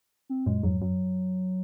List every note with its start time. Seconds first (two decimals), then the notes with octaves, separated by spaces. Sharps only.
0.29 C4
0.46 F#2 A#2 G#3
0.63 F2 G#2 F#3
0.81 F#2 F#3